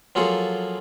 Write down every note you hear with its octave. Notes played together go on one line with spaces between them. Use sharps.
F3 F#3 A#3 F4 G#4 A4